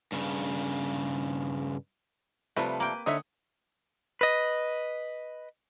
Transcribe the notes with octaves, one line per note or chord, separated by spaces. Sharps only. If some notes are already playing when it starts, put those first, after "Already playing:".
G2 C#3
C3 F3 G3 A3 B4
A#3 G5
D3 D#4 C#5 E5 D#6
B4 D#5